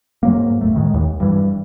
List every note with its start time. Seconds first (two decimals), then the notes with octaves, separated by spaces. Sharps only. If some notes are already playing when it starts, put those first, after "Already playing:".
0.23 G#2 F#3 A#3
0.61 D#1 A3
0.74 A2 D#3 G#3
0.94 D#2
1.20 G2 E3